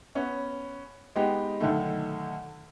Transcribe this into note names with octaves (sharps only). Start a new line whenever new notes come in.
B3 C#4
G#3 B3 D#4 G4
B1 D3 D#3 A3